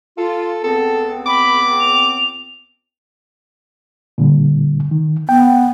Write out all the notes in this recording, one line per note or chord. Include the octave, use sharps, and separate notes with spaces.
F4 A4
C#2 B3 C4 A4
B5 D6
F7
A#2 D3 G3
D#3
B3 G5